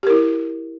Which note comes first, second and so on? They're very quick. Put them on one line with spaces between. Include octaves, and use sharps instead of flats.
G4 A#4 E4